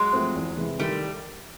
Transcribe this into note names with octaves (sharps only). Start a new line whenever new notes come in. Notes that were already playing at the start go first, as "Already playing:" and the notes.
Already playing: F#3 G#3
F3 A3 C4
E2
C3 E3 G#3
D#3 G3 A3